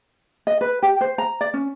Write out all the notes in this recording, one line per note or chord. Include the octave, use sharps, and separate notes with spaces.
D#5
B4
G4
C5
A#5
D5
C#4